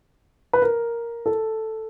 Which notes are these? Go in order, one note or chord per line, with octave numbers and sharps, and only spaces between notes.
B4
A#4
A4